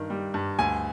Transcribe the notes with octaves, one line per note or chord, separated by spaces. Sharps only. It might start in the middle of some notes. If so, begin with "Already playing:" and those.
Already playing: G2 D#3
G3
G2
D2 G#5